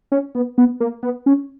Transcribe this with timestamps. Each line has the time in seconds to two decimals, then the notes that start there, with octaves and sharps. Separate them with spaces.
0.12 C#4
0.35 B3
0.58 B3
0.80 A#3
1.03 B3
1.26 C#4